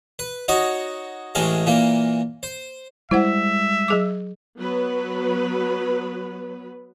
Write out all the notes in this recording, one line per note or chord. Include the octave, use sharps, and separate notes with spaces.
B4
D#4 F#4 C#5 D#5
A1 A2 E3 G#3 G#4 F5
A#2 E3 A#3
C5
G3 G#3 E4 C5 E5 F#5
F#3 G#4 D6
F#3 B3 B4